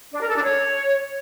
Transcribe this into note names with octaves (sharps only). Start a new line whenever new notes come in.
D4
A#4
A4
D4
C#5